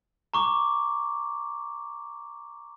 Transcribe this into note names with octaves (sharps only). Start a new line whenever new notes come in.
A#5 C#6 D6